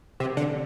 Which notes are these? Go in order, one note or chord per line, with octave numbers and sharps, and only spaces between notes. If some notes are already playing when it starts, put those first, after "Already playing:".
C3
D3